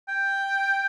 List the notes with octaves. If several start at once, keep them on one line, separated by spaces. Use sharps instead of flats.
G5